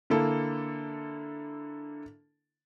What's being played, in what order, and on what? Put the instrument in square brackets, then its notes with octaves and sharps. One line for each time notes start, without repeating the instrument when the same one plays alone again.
[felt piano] D3 A#3 E4 A4